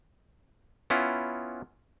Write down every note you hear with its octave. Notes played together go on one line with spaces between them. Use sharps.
B3 C#4 E4 F4